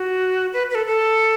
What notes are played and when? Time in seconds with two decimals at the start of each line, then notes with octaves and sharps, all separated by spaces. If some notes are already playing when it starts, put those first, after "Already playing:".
Already playing: F#4
0.53 B4
0.71 B4
0.75 A4
0.86 A4